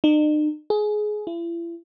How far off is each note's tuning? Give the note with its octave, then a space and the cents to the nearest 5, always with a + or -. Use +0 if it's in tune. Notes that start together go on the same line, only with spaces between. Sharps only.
D#4 -45
G#4 +20
E4 +40